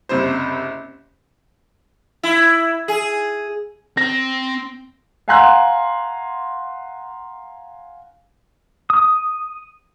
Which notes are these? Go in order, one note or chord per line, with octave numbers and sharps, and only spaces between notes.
F#1 C3 G3 C5
E4
G#4
C4 A#6
F5 F#5 G#5 A#5 C6 F#6
D#6